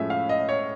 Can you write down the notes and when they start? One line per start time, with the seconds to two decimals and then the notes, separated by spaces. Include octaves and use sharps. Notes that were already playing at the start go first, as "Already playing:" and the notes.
Already playing: A2 F3 G#3 C#4 E5
0.10 F5
0.29 D#5
0.49 C#5